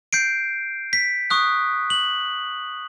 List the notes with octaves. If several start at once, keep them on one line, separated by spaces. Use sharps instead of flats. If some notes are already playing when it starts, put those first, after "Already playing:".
G6 C7 D7
B6
C#6 D#6 F#6
F#7